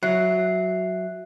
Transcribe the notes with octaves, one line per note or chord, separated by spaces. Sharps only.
F#3 E5 F#6 C7